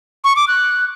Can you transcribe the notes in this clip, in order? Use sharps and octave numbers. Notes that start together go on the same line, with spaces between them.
C#6
D6
F#6